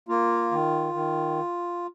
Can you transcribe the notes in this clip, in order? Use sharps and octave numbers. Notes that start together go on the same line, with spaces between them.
A#3 F4
D#3
D#3